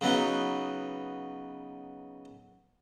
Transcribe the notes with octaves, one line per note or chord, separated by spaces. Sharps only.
C#3 F#3 B3 D#4